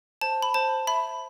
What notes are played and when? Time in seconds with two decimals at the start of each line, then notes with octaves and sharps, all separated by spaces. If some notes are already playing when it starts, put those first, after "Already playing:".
0.21 C5 A5
0.42 B5
0.54 C5 A5
0.87 E5 B5